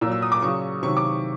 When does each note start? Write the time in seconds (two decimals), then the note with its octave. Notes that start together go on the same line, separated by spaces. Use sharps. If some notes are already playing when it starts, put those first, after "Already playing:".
0.01 A#2 E6
0.06 F#3
0.12 E6
0.22 D#6
0.32 D6
0.42 C#3 F#3 C#6
0.83 C3 D#3 F#3 C#6
0.97 D6